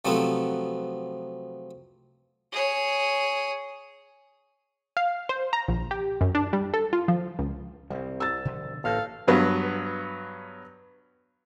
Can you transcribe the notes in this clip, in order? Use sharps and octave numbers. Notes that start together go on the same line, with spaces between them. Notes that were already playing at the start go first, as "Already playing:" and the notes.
C3 F3 F#3 A3 B3 C4
G#4 C#5
F5
C5
A#5
A#1
G4
F#2
D4
G3
A4
F4
F3
C#2
C2 G3 G#3 C4
E6 A6
B2 D3 F3
A1 G2 A#3 A4 F5 A#5
G2 F#3 B3